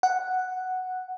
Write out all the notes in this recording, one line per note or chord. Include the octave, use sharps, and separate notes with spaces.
F#5